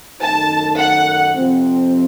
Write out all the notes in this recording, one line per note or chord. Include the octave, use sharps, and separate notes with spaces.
F#2 D#3 A3 D#4 A5
F#5
F2 C3 F3 C4